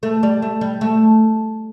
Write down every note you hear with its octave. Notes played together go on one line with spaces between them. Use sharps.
A3
G3
A3
G3
A3